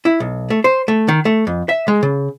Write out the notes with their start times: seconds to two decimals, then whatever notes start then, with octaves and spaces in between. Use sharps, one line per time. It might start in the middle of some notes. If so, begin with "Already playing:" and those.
0.05 E4
0.20 B1
0.50 A3
0.64 C5
0.88 A3
1.08 D#3
1.25 A3
1.47 F2
1.69 E5
1.88 G#3
2.03 C#3